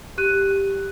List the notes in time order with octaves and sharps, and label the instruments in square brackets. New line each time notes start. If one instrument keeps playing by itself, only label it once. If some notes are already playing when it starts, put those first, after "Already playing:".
[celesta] G4 F#6 D#7